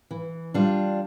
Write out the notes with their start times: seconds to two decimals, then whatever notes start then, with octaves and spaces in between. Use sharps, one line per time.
0.11 E3
0.54 G3 D4 F4